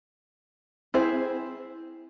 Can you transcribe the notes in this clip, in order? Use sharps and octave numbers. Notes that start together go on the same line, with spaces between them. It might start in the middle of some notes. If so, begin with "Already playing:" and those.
C4 E4 G#4 C5